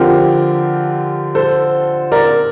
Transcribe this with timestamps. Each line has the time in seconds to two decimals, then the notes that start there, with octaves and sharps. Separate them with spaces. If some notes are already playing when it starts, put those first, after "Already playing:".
Already playing: D3 F3 C4 F4 G4 A#4
1.35 A4 C5
2.12 A#4 D5